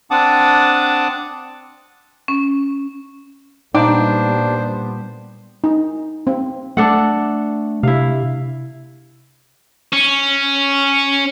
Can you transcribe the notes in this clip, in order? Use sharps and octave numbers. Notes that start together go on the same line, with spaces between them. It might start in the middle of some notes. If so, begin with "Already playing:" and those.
C4 D4 F#5 A5 D6 D#6
C#4
A#2 G3 B3 D4 D#4 C5 G5 D6
D#4
C4
A3 D4 A4 F#5
C3 E4 F5
C#4